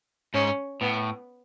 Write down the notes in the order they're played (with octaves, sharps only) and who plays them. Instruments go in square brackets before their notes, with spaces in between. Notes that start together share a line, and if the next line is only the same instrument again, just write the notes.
[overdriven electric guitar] G#2 [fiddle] C#4
[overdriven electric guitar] A2 [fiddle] B3